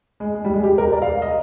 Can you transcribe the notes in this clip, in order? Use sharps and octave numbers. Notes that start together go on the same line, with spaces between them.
G#3
G#3
G3
G#3
G4
A#4
D5
F5
D#5